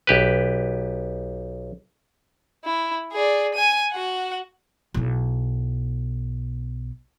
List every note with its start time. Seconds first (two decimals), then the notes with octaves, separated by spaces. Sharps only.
0.07 B1 G4 B4
2.64 E4
3.13 G#4 D5
3.54 G#5 D#7
3.92 F#4 F#5
4.94 B1 E4